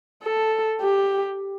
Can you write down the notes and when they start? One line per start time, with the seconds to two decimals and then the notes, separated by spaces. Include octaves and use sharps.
0.23 A4
0.81 G4